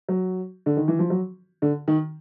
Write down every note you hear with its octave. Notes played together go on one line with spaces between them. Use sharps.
F#3
D3
D#3
E3
F3
F#3
D3
D#3